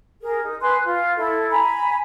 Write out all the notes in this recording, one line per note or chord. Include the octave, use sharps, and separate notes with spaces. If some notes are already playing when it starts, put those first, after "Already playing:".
G#4 A#4
D#4
B4 G#5 C6 F#6
F4
E4 A4
G#5 A#5 B5